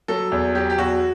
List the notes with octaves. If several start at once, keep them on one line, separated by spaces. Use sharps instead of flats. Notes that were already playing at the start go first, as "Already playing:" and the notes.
F#3 A4
E2
F#3 G4
G4
E2 F#4